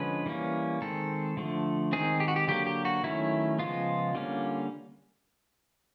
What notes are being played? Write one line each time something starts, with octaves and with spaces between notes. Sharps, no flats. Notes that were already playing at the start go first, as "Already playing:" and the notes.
Already playing: D3 F3 G#3 C#4 B4
E3 G3 A#3 C#4
D#3 G#3 C4 A4
D3 F3 A3
D#3 G#3 C4 G#4
G4
F#4
G4
D3 F#3 A#3 G4
G4
F#4
D#3 F#3 A3 C#4 E4
C#3 F3 G#3 B3 F4
D3 G3 A#3 C#4